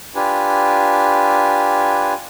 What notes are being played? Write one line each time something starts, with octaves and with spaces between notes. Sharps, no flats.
D4 F4 G4 B4 G#5